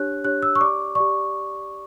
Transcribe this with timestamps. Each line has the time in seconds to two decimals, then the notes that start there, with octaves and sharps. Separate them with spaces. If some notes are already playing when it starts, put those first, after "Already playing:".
Already playing: D4 G4 C#5 F#6
0.24 D4 G4 C#5 F#6
0.43 E6
0.55 C#6
0.60 G4 D5 D6
0.95 G4 D5 C#6